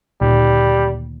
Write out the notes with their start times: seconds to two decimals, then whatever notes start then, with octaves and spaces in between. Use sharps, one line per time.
0.21 D2 A#2 D#3 G3